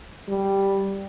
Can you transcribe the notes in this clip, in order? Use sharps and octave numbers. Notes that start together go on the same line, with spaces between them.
G3